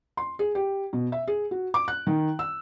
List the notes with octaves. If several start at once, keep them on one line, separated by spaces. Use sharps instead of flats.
C6
G#4
G4
B2
E5
G#4
F#4
D6
F#6
D#3
E6